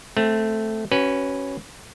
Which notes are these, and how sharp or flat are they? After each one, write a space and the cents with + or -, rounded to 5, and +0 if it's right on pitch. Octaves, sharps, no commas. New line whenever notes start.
A3 +0 C4 +0
C#4 -5 F#4 +25 B4 +0